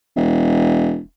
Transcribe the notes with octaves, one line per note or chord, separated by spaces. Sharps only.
E1